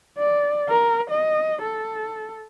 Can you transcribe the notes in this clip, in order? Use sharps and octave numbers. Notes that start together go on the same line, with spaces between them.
D5
A#4
D#5
A4